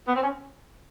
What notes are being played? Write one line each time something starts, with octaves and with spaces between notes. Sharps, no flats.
B3
C4
C#4